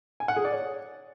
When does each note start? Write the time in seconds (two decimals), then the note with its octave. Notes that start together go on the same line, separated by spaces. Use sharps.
0.20 G#5
0.28 F#5
0.36 G#4
0.45 D5
0.53 C#5